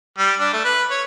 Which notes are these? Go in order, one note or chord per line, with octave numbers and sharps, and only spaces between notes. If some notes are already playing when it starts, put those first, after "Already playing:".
G3
D4
A3
B4
C#5